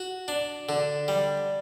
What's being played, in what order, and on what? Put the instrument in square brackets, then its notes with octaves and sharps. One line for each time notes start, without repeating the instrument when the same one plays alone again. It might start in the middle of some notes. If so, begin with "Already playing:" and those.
Already playing: [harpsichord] F#4
D4
D3
G3